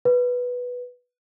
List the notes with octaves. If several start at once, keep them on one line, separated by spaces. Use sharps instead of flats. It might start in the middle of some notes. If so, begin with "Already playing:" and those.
B4